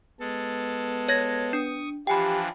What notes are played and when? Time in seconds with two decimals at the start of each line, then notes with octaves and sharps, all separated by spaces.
0.20 G#3 B3 A4
1.08 C#5 G#6 A#6
1.53 D4 C#6 D#6
2.07 E3 F3 D4 G4 G5 G#5 B5